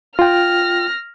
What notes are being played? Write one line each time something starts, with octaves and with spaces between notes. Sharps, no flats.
F4 G5 F6 A#6